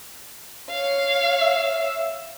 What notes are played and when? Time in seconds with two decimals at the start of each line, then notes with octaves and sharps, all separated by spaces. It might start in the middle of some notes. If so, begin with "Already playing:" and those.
0.70 C#5 F5
1.41 E5